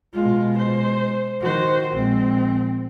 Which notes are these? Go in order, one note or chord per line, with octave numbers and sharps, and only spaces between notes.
B2 G#3 F4
C5
D#3 F#4 C5
A#1 G#3 C4